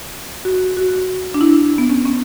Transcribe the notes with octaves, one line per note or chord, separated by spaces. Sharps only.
F#4
F#4
D4
E4
B3
C#4
C#4